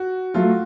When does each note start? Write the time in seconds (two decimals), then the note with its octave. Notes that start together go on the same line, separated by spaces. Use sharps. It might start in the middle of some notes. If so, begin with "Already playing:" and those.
Already playing: F#4
0.34 F#3 A3 F4